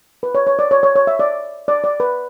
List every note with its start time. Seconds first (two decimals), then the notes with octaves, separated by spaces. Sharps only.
0.23 B4
0.35 C#5
0.47 C#5
0.59 D5
0.71 C#5
0.83 C#5
0.96 C#5
1.07 E5
1.19 D5
1.68 D5
1.84 D5
2.00 B4